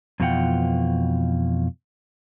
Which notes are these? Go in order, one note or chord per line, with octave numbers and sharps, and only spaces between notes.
F2 B2 E3 F4 F#5 G5